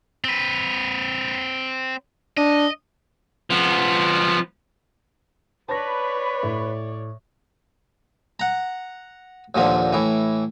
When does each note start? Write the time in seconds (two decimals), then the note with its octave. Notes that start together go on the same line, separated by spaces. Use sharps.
0.24 C4 B4
2.37 D4 D#5
3.50 F3 B3
5.69 B4 C#5 D5 A5 B5 A#6
6.43 A2
8.40 F#5 A#5
9.55 D#2 A#2 D3 F3
9.93 A2 E3